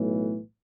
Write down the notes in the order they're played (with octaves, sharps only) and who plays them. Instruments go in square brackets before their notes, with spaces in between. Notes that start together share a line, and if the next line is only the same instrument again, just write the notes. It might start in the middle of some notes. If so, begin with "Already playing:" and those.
Already playing: [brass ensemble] B1 A2 E3